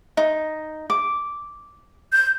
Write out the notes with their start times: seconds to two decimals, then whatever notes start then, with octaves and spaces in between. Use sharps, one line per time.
0.17 D#4
0.90 D6
2.13 G6